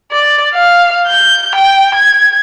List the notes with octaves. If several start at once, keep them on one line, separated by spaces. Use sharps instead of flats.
D5
F5
G6
G5
G#6